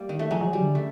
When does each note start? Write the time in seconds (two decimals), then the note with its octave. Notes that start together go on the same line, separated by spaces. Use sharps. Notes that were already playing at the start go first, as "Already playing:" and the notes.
Already playing: G3 A#3
0.09 D#3
0.19 A3
0.31 F3 G#3
0.41 F3
0.46 F#3
0.53 G3
0.60 D3
0.75 C#3 A3